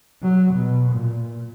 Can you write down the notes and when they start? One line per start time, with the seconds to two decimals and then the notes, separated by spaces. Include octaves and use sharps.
0.22 F#3
0.54 B2
0.91 A#2